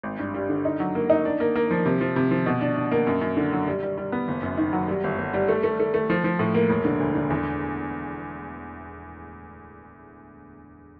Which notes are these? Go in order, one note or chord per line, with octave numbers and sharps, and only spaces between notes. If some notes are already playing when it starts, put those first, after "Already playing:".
G#1
G2
G3
D3
D#4
F#3
A#3
D#4
D4
A#3
A#3
F3
C3
F3
C3
F3
B2
D4
D4
A#3
F#2
F#2
D3
F#3
G3
G3
G3
B3
F#1
F#2
D#3
F#3
G3
G1
G1
G3
A3
A3
A3
A3
F3
F3
A2
A#3
E1
D3
D2
D3
E2